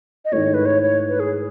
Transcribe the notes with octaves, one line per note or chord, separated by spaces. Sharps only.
D#5
G#2 D#3 A3 E4 C#5
B4
C#5
C#5
B4
G#4